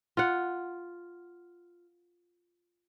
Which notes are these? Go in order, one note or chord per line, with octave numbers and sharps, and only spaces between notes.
F4 F#5